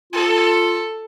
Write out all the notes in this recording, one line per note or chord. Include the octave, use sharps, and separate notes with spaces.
F4 A4